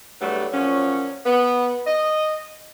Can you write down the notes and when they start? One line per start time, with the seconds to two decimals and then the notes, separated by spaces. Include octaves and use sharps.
0.21 E2 G2 F#3 G3 A3
0.52 A#2 F3 F#3 C#4
1.26 B3
1.87 D#5